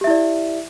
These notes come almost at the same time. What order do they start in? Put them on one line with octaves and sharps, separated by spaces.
G4 E5 E4 D5